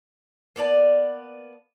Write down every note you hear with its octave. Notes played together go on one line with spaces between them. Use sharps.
A#3 B3 D5 A5